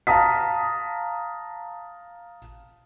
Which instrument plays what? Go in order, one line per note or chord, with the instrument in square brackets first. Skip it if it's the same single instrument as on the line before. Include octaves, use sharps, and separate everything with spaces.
[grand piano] F5 A5 A#5 D#6 B6